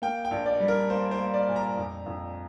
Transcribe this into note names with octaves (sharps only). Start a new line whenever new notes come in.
A#3 G5
G5
A#1
D5
G3
A#4
A#3 C5
C5
A#3
D5
A#2
A#5
F2
F2